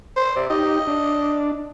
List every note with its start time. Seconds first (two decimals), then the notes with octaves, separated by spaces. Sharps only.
0.16 C5
0.36 C3 D5
0.50 D#4 G4 D#5
0.87 D4